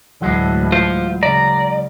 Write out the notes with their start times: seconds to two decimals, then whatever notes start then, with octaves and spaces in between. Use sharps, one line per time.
0.21 D2 A2 E3 F#3 G#3
0.72 F4 C5
1.23 C#3 D5 A#5